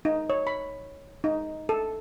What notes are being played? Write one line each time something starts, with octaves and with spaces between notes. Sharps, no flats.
D#4
C#5
B5
D#4
A4